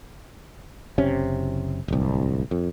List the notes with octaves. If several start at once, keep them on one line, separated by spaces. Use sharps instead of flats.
F#1 C3 C#4
D1 C2
F2